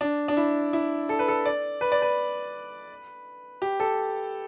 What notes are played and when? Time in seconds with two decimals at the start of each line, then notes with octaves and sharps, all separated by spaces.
0.01 D4
0.28 D4
0.37 E4
0.73 E4
1.09 A4
1.19 B4
1.28 A4
1.46 D5
1.81 B4
1.92 D5
2.02 B4
3.62 G4
3.80 A4